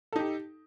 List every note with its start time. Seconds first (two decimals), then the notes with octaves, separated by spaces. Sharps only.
0.12 A4
0.16 D#4
0.19 G4